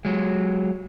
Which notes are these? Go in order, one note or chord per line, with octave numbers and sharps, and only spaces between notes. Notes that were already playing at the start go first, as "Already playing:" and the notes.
F#3 G#3